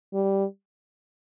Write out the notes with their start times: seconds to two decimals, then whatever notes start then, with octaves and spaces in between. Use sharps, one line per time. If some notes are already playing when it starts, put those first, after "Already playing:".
0.14 G3